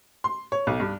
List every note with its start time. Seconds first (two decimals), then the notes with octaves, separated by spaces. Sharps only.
0.24 C6
0.52 C#5
0.67 B1
0.80 G2